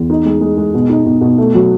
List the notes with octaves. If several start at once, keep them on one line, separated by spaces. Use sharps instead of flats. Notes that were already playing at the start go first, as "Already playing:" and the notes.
Already playing: E2
D#4
G#3
G#3
G#3
B2
D#4
B2
B2
A3
F#3